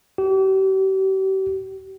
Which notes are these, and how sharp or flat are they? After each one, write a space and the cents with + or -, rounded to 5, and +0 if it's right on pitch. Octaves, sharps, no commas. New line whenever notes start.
G4 -40